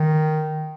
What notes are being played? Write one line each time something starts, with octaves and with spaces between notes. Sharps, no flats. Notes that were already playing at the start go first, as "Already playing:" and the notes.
Already playing: D#3